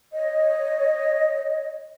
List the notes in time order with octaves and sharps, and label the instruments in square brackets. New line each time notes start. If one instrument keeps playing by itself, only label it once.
[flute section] C#5 D#5